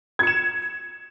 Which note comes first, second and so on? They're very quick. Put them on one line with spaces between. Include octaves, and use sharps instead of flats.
G#6 C#7 E7